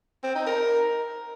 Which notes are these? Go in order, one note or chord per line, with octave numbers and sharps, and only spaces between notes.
C4
D#4
A#4